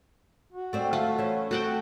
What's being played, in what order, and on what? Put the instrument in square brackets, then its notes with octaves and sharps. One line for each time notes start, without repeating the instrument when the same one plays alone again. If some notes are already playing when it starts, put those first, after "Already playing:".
[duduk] F#4
[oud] A3 C4 D5
[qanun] A3 [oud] F4
[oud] E3 C#4 C5
[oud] A3 C4 [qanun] F#4 F#5 G5